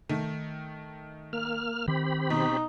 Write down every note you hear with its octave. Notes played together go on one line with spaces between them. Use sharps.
D#3 A3
A#3 F6
D#3 C4 G4 B5
B2 D#4